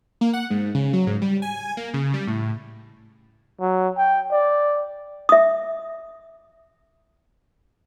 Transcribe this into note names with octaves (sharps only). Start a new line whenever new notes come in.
A#3
F#5
G#2
C#3
F#3
G#2
G3
G#5
A#3
C#3
G3
A2
F#3
G5
D5
E5 D#6